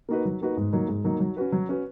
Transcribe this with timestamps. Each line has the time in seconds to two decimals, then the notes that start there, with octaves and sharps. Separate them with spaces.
0.09 A#3 D#4 F#4 B4
0.25 F#3
0.41 A#3 D#4 F#4 B4
0.57 G#2
0.73 F#3 A#3 D#4
0.89 G#2
1.04 F#3 A#3 D#4
1.20 F#3
1.37 C#4 F#4 B4
1.52 F#3
1.69 C#4 F#4 B4